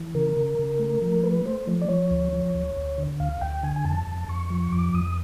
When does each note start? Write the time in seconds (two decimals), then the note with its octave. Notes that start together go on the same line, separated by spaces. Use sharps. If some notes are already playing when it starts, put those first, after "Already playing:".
Already playing: E3
0.14 C#3 A#4
0.37 C#3
0.59 C#3
0.79 A3
1.02 F3
1.23 A3 B4
1.46 A3 C5
1.67 F3
1.81 D5
1.89 F3 C#5
2.11 D2
2.33 F3
2.55 D2
2.76 D2
2.98 D3
3.20 D2 F5
3.41 D2 G5
3.63 D3 G#5
3.76 G#5
3.85 F2 A5
4.07 F2
4.28 F2 C#6
4.50 F3
4.72 F2 D6
4.94 F2 D#6